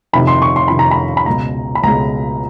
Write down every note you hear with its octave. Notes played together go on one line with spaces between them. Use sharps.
F2 C3 D#3 B5
C6
C#6
C6
F2 C3 D#3 B5
A#5
B5
B5
C#2 B2 G#3 A#5
B5
C#2 B2 G#3 A#5